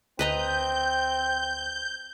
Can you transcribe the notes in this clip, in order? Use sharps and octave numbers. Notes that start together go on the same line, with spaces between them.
D2 C4 B4 D#5 A#5 G6